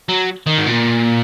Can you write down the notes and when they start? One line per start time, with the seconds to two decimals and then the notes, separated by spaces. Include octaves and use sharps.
0.09 F#3
0.46 D#3
0.58 G#2
0.66 A#2